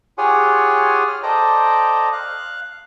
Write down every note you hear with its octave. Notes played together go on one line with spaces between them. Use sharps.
F4 G4 G#4 C#5 F#5 G#5
F6
A4 C5 D5 D#5 G5 A#5
F5 F#6